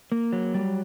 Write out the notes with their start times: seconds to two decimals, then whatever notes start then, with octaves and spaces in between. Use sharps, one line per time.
0.12 A#3
0.33 F#3
0.54 G3